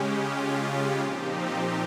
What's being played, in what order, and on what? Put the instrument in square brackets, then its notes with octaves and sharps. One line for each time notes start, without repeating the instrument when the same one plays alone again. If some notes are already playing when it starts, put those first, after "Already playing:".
Already playing: [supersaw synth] C#3 G#3 C#4 G4
F4
A#2 F3 C4 D#4 G4
G4